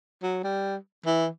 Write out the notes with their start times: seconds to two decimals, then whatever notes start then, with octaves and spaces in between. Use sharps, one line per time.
0.23 F#3
0.43 G3
1.05 E3